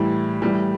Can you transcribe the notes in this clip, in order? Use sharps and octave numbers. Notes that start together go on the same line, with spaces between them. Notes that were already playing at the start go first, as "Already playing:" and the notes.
Already playing: A2 E3 G3
A2 E3 G3